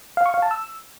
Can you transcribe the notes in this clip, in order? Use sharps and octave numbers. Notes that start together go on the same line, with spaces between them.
F5
C#6
F5
A5
E6